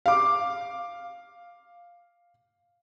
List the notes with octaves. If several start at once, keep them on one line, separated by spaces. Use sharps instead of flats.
F5 D6